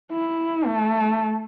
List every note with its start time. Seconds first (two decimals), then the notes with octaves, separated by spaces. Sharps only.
0.12 E4
0.66 A3